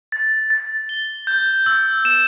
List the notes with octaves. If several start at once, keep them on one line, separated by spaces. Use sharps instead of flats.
A6
A6
G7
G6
E6
E7